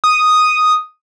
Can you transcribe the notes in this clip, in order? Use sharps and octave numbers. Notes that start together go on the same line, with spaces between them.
D#6